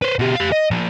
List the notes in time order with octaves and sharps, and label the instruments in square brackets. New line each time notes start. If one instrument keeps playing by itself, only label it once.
[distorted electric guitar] B4 C5
B2 G4
G4 F5
D#5
F3 A#3